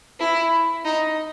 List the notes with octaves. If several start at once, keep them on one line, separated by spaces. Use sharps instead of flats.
E4
D#4